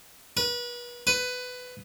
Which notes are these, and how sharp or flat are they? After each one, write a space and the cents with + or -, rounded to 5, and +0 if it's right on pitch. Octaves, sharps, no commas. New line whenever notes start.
B4 -35
B4 +15